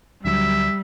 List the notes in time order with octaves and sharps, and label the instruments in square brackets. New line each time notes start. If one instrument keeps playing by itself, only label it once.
[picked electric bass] D2 D3 F#3 [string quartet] G3 [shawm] E5